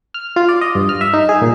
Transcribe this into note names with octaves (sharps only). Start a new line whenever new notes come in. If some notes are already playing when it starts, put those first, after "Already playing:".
F6
F4
D5
D#5
G2
F6
E5
D#4
G#4
A#2